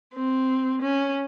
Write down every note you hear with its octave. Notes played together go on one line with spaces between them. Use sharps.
C4
C#4